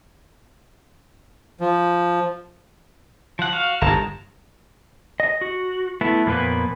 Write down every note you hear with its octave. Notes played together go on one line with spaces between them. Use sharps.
F3
F3 F#5
F#4 F5
G1 G2 G#3 A5 A#5
D#5
F#4
A3 B3 E4
F2 A#2 A#3 B3 B4